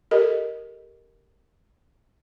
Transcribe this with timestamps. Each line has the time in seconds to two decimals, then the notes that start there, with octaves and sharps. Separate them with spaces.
0.11 G4 A4 A#4 D#5